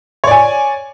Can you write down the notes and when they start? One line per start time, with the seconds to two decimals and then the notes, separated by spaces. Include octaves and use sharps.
0.24 C#5
0.27 D5
0.31 G#5